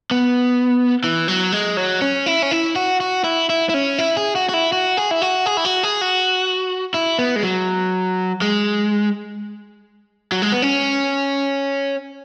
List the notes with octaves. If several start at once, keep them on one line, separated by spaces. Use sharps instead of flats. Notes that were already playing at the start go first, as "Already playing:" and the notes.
B3
E3
F#3
G#3
F#3
C#4
E4
C#4
E4
F#4
F#4
E4
E4
E4
C#4
E4
G#4
F#4
F#4
E4
F#4
G#4
E4
F#4
G#4
E4
F#4
G#4
F#4
E4
B3
G#3
F#3
G#3
F#3
G#3
B3
C#4